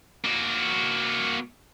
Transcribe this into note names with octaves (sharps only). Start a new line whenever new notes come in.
A#3 F#4